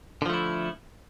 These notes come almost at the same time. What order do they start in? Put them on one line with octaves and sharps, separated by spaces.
D3 F3 A3 E4